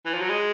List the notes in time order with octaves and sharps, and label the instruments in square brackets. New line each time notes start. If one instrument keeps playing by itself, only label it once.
[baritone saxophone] E3
F3
F#3
G#3